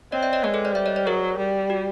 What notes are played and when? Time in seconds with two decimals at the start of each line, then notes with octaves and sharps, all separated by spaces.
0.12 C4 C#5 D#5
0.23 D5 E5
0.33 C#5 D#5
0.44 G#3 B4 C#5
0.54 A4 B4
0.65 C5 D5
0.75 G3 D5 E5
0.86 C#5 D#5
0.96 C5 D5
1.06 F#3 G#4 A#4
1.38 G3
1.70 F#4